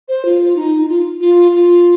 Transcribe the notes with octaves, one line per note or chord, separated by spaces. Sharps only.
C5
F4
D#4
D#4
F4
F4
F4